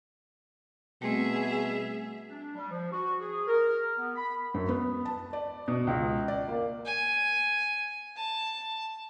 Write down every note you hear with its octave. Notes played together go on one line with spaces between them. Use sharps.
B2 G3 A3 C4 G#4 E5
D4
G3
F3
F#4
G#4
A#4
B3
B5
F#2
B3
A5
D5
B2
C#2
D5
A#3
G#5
A5